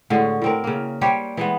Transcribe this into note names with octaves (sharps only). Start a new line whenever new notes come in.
A2 D3 G#3 F#4
A2 C4 A#4
C#3 A#3
G3 G4 C5 C#5
E3 G#3 B3